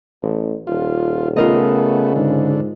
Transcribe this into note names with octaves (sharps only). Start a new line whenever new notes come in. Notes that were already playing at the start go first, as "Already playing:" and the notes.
A1
D#1 F4
C#3 A3 B3 F4 A#4 D#5
G#2 D3